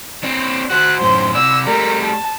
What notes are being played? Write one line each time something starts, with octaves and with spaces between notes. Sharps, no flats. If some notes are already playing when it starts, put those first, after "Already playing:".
C4 D4
F#4 C5 F#6
F#2 A2 C5
C3 D5 E6
G3 A3 A#4
A5